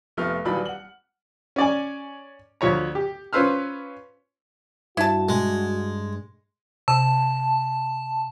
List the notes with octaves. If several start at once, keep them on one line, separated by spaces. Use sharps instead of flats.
F1 A3 B3 F6
D#1 D#2 E3 F#3 D5 B5
F#5 F#7
C#4 D5 G#5
D2 F3 C#5 A#5
G4
C#4 F4 B4 C5 E6 F6
G2 E4 F#4 A5
G#3
C3 A5